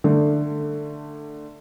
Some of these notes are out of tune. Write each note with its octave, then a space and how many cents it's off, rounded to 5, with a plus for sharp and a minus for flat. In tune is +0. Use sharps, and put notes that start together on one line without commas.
D3 +15 A3 +15